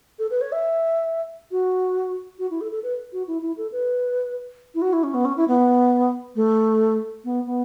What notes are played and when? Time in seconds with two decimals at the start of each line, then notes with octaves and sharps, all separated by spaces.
0.19 A4
0.30 B4
0.41 C#5
0.52 E5
1.51 F#4
2.39 F#4
2.51 E4
2.61 A4
2.72 A4
2.83 B4
3.13 F#4
3.27 E4
3.42 E4
3.57 A4
3.72 B4
4.75 E4
4.82 F#4
4.93 E4
5.03 C#4
5.14 B3
5.25 C#4
5.37 E4
5.48 B3
6.35 A3
7.24 B3
7.46 B3